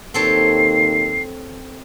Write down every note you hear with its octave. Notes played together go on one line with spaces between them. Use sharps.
D#2 C4 A4 C#5 C7